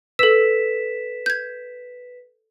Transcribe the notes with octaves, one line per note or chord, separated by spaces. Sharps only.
A4 B4 E6 B6 E7
G6 G#6